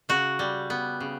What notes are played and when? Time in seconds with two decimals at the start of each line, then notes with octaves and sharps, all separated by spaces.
0.09 C#3 F#4
0.39 G3
0.70 B3
1.00 C#3